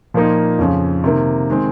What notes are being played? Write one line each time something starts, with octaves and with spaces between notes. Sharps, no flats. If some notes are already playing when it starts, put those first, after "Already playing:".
A#2 F3 A#3 D#4
F2 C#3 F3
C3 D#3 A#3
D#3 G#3 C4